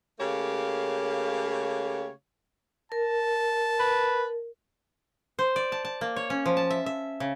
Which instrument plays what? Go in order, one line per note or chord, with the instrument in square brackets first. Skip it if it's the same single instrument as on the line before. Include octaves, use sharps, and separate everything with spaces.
[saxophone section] C#3 A3 A#3 G4 C#5 F5
[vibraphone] A#4 [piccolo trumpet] A5
[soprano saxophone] B4
[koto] C5
D5
A5
A5
A#3
C#5
C#4
F3
A5
E5
E5
C#3